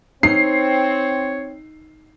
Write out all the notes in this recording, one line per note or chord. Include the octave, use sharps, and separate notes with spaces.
C4 D#4 C#5 C7